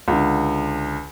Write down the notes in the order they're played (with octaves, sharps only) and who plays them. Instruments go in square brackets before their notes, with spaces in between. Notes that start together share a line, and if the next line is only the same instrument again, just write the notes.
[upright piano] C#2 D3